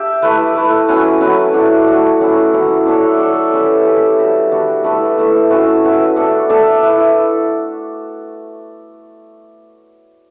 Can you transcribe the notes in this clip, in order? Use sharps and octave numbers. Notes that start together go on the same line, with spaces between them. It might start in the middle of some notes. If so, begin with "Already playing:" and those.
Already playing: D4 G4 E5
A3 E4 B4
A3 E4 B4
F#3 C#4 E4 B4
F#3 C#4 E4 B4
A3 D4 F#4
A3 D4 F#4
F#3 C#4 E4
F#3 C#4 E4
D4 A4 C#5 E5
D4 A4 C#5 E5
C#4 G4 B4 E5
C#4 G4 B4 E5
G3 D4 F#4
G3 D4 F#4
A3 E4 B4 E5
A3 E4 B4 E5
C#4 F#4 B4 E5
C#4 F#4 B4 E5
D4 A4 E5
D4 A4 E5
E4 B4 E5